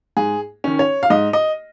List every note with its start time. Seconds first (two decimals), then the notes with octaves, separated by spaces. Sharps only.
0.17 G#2 G#4
0.64 D#3 C#4
0.79 C#5
1.03 F5
1.10 G#2 D#5
1.33 D#5